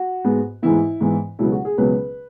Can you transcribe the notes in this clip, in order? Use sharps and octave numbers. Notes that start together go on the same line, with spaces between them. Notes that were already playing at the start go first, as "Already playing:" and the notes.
Already playing: F#4
G#2 G#3 B3
G#2 E3 B3 E4
G#2 E3 B3
C#2 B2 F#3 B3 E4
F#4
G#4
C#2 B2 F#3 B3 B4